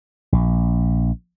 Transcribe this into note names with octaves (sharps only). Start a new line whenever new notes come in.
A#1